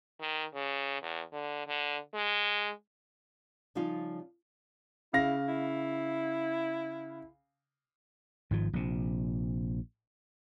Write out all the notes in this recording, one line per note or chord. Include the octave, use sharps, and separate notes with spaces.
D#3
C#3
E2
D3
D3
G#3
C#3 F3 G3 D#4 F4
C#3 E4 F5 A#6
E4
G#1 G#2 F3
A#1 C3